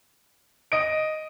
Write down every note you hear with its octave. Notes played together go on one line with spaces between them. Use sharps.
D#5 D7